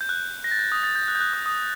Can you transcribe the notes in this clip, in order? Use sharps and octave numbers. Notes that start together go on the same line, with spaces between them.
G6
F#6
A#6
A6
G6
D#6
A6
G6
F#6
G6
F#6
D#6
D#6